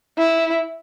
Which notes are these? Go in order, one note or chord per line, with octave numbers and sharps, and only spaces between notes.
E4